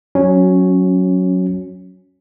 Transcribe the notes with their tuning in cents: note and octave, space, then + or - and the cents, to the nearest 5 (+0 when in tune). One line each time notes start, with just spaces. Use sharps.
F#3 -5 C#4 +0